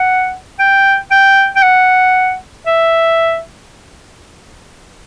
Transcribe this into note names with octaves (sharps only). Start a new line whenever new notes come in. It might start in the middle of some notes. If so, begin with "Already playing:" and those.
Already playing: F#5
G5
G5
G5
F#5
E5